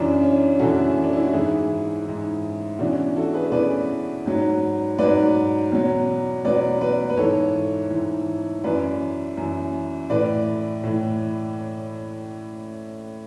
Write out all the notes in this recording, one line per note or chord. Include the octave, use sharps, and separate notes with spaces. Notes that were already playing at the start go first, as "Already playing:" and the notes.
Already playing: F#2 C#3 E3 D4
C#4
F#2 C#3 E3 F#4 A4
D4
E4
F#4
G#2 E3 E4 G#4
G#2 E3
E2 C#3 E3 D4 F#4
F#4 A4
G#4 B4
E2 C#3 E3 B4 D5
G#2 F#3
G#2 F#3 B4 D5
E2 B2 F#3
E2 B2 F#3 B4 D5
B4 D5
B4
G#2 E3 A4 C#5
G#2 E3
F#2 E3 B4 D5
F#2 E3
A2 E3 B4 D5
A2 E3